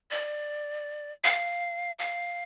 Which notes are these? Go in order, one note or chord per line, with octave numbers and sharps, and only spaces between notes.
D5
F5
F5